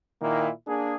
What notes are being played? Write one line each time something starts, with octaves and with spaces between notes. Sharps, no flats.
A#2 D#3 A#3 E4
A#3 D4 G#4